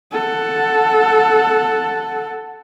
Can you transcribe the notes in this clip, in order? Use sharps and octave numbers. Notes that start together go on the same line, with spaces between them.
A4 F#5